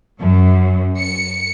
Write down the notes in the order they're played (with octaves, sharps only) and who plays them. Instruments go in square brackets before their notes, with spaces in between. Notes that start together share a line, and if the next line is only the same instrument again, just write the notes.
[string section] F#2
C#7